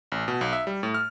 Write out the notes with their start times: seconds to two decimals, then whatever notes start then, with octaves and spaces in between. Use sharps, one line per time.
0.12 A1
0.28 B2
0.41 B1
0.53 E5
0.67 G3
0.83 A2
0.94 F6